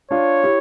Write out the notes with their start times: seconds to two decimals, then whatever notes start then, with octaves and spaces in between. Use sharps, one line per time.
0.11 D4 F4 C#5
0.43 E4 G4